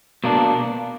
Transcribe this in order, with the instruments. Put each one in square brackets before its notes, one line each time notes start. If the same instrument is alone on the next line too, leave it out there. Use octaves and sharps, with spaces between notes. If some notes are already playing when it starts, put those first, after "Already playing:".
[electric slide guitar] B2 A#3 D4